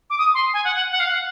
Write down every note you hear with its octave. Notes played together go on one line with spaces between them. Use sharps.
D6
D#6
C6
G#5
F#5
F#5
F#5
F5
F#5